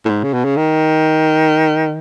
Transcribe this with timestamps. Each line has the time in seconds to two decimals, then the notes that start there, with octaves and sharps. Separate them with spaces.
0.05 A2
0.10 G#2
0.23 C#3
0.34 B2
0.45 C#3
0.57 D#3